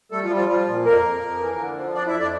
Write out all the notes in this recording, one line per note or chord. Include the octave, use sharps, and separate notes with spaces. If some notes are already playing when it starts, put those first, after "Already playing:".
G3 A3 A4
F3 F4
G3
F3 F4
F3 G3 F4
A#2
F2 A#3 A#4
F2
F2
E3
D3
F3
F2 D4 D5
E4 E5
F2
D4 D5